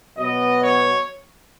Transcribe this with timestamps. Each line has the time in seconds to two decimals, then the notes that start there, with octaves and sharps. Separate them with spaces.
0.17 B2 F#3 B3 D#5
0.62 C#5